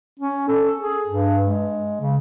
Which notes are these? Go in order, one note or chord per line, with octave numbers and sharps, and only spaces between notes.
C#4
A4
G#4
G2
G#3
C#3